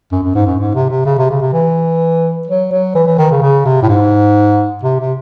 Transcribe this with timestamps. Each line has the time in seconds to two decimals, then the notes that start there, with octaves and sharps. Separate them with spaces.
0.12 F#2
0.23 F#2
0.35 G#2
0.46 F#2
0.59 G#2
0.75 C3
0.90 C3
1.05 C#3
1.18 C3
1.30 C#3
1.41 C3
1.53 E3
2.47 F#3
2.71 F#3
2.95 E3
3.06 E3
3.18 D#3
3.31 C#3
3.42 C#3
3.65 C3
3.82 A2
3.89 G#2
4.83 C3
4.99 C3